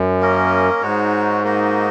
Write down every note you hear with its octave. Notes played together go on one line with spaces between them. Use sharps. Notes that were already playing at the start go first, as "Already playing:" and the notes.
Already playing: F#2
A#3 C#4 A#4 D#5
G#2 G#3 D#4 F#4 C#5
A#3 D#4 F#4 D#5